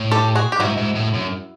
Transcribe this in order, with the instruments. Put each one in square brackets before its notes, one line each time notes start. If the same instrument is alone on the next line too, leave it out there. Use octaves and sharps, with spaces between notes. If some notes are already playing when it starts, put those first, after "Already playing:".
Already playing: [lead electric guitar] A2
[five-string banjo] G4 A4
F#4 G#4
G4
[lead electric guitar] G#2 [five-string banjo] E4 F#4
[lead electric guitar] G#2
A2
F#2